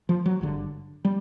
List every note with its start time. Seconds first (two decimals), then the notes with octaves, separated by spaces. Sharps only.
0.09 F3
0.26 F#3
0.41 G#1 G2 D3
1.05 G3